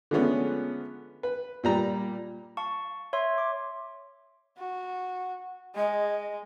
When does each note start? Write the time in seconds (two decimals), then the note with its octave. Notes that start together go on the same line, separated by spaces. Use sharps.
0.11 D3 F3 G#3 A3 B3 C#4
1.23 B4
1.64 A#2 G3 A#5
2.57 F5 A5 C#6
3.13 C#5 E5 C6
3.38 D6
4.58 F#4
5.76 G#3 D#5